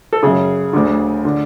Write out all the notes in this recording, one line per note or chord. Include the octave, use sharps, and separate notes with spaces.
A4
F#2 C#3 G#4
D2 D3
D3